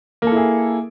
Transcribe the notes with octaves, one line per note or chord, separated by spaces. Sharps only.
A#3 E4 G#4 A4